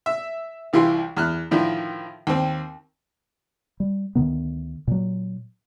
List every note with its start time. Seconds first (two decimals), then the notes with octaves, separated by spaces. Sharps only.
0.06 E5
0.73 C2 E3 F4 G4 C6
1.17 E2 F6 F#6
1.51 A2 D3 D#3 F3
2.27 D#2 C4
3.80 G3
4.15 D2 D3 D#3 B3
4.87 A#2 F#3